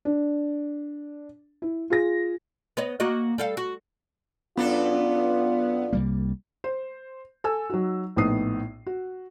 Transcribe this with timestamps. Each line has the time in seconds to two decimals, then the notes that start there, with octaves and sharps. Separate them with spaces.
0.05 D4
1.62 E4
1.90 F4 G#4 A#6
2.77 B3 C#5 D#5
3.00 A#3 F#4 D#5
3.38 G3 A4 F5
3.57 F#4
4.57 F#2 B3 D4 F4 A4
5.93 C2 G3 A#3
6.64 C5
7.44 A4 G#5 E6
7.70 F#3 D#4 F#4
8.16 A#1 A2 B3 D#4 D#6 C7
8.87 F#4